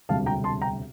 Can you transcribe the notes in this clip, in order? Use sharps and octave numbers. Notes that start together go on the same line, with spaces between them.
E1 D2 C3 G3 F5 A5
G5 A#5
A5 C6
G5 A#5